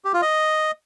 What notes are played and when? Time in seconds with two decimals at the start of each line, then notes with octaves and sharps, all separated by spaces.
0.05 G4
0.13 F4
0.22 D#5